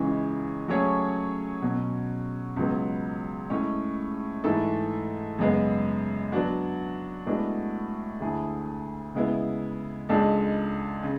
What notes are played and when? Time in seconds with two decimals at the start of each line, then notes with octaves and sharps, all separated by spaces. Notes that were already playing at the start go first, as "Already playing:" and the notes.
Already playing: C#2 C#3 E3 G#3 C#4
0.68 F#3 A3 C#4 G#4 C#5
1.62 B2 F#3 C#4
2.56 C#2 C#3 F#3 B3
3.50 A2 G#3 C#4
4.44 G#2 E3 A3 E4 A4
5.38 F#2 C#3 G#3 B3
6.32 F#3 B3 D4 F#4
7.26 A2 G#3 B3 D4 F#4
8.20 D2 D3 A3 E4 G#4
9.14 C#3 G#3 B3 E4
10.09 C#2 C#3 G#3 D4 A4
11.03 C#3